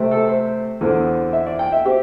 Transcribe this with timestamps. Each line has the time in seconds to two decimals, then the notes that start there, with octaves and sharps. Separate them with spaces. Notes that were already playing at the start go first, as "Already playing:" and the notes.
Already playing: C3 A3 C4
0.11 A4
0.29 C5
0.81 E2 D3 C4
1.33 E5
1.47 D5
1.59 G5
1.73 E5
1.85 C4 G4